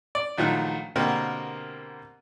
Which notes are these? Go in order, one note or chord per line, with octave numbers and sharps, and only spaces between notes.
D5
A#1 D#3 F3 F#3 A3 F#6
B2 D3 A#3 C4 G4 A#4